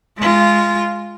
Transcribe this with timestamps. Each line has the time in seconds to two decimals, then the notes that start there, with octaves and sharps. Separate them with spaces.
0.17 G#3 F4